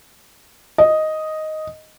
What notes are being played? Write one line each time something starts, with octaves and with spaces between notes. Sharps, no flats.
D#5